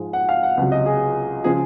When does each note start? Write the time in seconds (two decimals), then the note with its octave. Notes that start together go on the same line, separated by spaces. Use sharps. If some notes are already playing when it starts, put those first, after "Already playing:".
Already playing: G#2 F3 G#3
0.13 F#5
0.29 F5
0.43 F#5
0.57 C#2 C3 F#3
0.72 D#5
0.86 G#4
1.44 C#3 F3 G#3 G#4